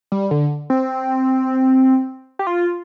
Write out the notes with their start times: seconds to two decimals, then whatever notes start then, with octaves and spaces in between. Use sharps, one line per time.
0.12 G3
0.31 D3
0.70 C4
2.39 G4
2.47 F4